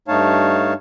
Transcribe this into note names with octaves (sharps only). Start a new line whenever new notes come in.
G2 A3 D#4 C#5 F5 A5